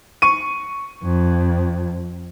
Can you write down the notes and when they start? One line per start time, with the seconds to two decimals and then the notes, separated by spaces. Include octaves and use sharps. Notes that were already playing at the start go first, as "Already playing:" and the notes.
0.22 C#6 D#7
1.03 F2